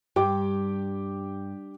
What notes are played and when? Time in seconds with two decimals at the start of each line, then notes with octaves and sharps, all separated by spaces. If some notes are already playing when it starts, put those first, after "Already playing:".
0.16 G2 G4 G5 D6